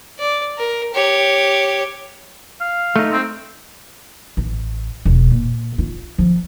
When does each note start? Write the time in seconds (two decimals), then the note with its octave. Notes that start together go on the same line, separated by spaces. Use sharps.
0.19 D5
0.58 A#4
0.94 G4 C#5
2.61 F5
2.96 A3 D#4
3.12 C4
4.37 A1
5.05 E1
5.31 A#2
5.78 F4
6.18 F3